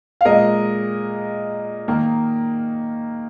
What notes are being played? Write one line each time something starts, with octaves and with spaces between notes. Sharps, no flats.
F5
A#2 G#3 A#4 D#5
D#3 A#3